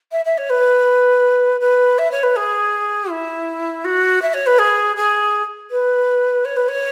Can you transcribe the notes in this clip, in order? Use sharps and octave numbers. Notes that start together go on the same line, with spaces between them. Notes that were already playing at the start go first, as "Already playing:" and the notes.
E5
E5
C#5
B4
B4
E5
C#5
B4
G#4
E4
F#4
E5
C#5
B4
G#4
G#4
B4
C#5
B4
C#5